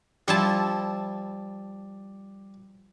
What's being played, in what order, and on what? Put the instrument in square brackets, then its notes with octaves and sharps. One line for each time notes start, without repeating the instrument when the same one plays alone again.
[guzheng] F3 E4 A5 [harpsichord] G3